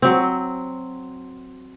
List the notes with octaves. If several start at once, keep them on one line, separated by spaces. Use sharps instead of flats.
F#3 C4